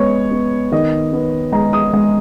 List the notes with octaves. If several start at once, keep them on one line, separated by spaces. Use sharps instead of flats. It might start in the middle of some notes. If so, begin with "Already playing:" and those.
Already playing: G#3 B3 C#5
B3
D#3 D#5
B3
G#3 A#5
D#6
G#3